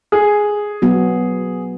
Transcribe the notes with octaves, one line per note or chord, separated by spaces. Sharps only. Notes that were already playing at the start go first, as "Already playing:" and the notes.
G#4
F#3 B3 F#4